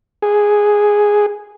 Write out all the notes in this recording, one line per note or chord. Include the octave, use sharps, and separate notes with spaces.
G#4